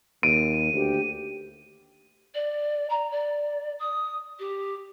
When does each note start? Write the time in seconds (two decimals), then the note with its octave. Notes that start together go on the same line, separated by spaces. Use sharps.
0.23 D#2 D7 D#7
0.74 D2 G4
2.35 D5
2.90 A#5
3.11 D5
3.79 D#6
4.39 G4